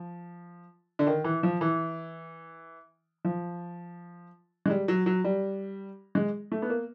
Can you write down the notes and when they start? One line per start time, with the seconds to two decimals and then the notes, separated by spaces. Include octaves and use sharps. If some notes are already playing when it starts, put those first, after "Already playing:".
Already playing: F3
0.99 D3
1.07 D#3
1.24 E3
1.43 F3
1.61 E3
3.25 F3
4.66 G#3
4.70 G3
4.88 F#3
5.06 F#3
5.24 G3
6.15 G#3
6.52 A3
6.62 B3
6.70 A#3